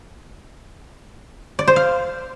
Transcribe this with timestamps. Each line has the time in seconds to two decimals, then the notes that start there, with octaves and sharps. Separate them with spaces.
1.59 D5
1.68 C5
1.76 F5